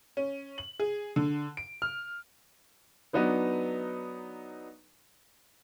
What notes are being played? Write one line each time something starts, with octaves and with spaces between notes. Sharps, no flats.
C#4
F#7
G#4
D3
D7
F6
F#3 B3 D4 D#4 B4